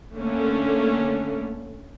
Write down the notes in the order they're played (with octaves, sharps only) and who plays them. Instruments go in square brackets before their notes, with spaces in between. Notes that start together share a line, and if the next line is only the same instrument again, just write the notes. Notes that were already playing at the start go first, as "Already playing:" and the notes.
[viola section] D3 A3 A#3 C#4